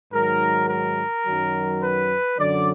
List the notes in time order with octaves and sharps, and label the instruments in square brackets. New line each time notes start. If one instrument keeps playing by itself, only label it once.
[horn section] G#2 D#3 F#3 A#4
A#4
F#2 D#3 F#3
B4
F#2 D3 F#3 D5